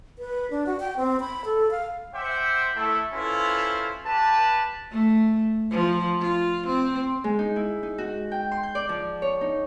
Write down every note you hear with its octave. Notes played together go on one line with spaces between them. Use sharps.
B4
D4
F#4
G5
C4
B5
A4
F5
C5 E5 F#5 G5 C6 D6
A3 E4 A4
C#4 E4 F4 A4 B4 C5
G4 B4 A5
A3
F3
F4
C4
G#3
D#4
E4
D#4
F#4
G5
C6
G6
D5
F3
C#5
D#4